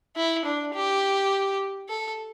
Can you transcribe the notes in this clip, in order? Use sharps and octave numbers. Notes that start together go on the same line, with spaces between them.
E4
D4
G4
A4